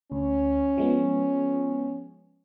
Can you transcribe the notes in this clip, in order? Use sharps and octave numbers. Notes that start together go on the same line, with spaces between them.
D2 C#4
F3 G#3 B3